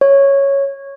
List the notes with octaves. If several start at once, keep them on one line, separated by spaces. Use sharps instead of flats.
C#5